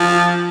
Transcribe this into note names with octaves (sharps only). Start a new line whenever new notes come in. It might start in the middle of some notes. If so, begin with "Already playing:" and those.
Already playing: F3